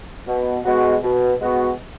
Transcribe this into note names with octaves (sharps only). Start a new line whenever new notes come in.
B2
G#3 B3 F#4
B2
G#3 B3 F#4